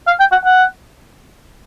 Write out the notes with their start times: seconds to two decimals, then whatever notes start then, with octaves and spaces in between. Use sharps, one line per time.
0.07 F5
0.19 G5
0.32 F#5
0.45 F#5